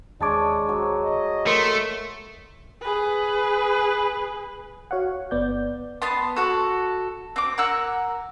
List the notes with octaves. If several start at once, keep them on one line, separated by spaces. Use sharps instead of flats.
D#2 G#3 D4 C#5 D#5 A5 D6
F#3
D#5
A3 A#4 C6
G#4 B4
F#4 C#5 F5 F#5
G1 B3 D5 G6
B3 A5 C6
F#4 A4
C4 D6
A#4 F#5 E6